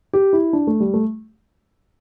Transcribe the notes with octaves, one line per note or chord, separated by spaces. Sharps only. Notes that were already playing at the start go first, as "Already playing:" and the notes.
G4
E4
D4
A3
G3
A3